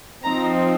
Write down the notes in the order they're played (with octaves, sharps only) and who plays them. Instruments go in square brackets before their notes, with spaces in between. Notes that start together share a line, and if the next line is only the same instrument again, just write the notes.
[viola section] F3 C4 D#4 A#5